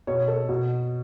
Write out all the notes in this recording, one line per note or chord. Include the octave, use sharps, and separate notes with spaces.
B2 C#5
A4
B2 F#4